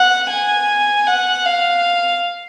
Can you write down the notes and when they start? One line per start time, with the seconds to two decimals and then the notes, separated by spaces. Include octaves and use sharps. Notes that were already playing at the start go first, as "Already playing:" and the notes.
Already playing: F#5
0.30 G#5
1.07 F#5
1.45 F5